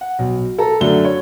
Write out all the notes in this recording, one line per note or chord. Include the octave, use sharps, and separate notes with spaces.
F#5
B1
A4 A#5
F#2 D3 A3 G7
C#5